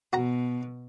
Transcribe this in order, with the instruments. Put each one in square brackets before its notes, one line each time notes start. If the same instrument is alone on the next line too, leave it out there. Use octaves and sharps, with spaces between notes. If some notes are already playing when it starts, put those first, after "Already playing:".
[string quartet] B2 [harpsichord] F#4 A#5